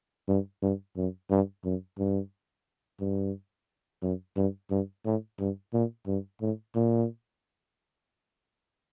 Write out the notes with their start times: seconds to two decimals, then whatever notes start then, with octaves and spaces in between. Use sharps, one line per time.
0.28 G2
0.62 G2
0.97 F#2
1.30 G2
1.65 F#2
1.99 G2
3.00 G2
4.02 F#2
4.36 G2
4.71 G2
5.05 A2
5.39 G2
5.73 A#2
6.07 G2
6.41 A2
6.75 A#2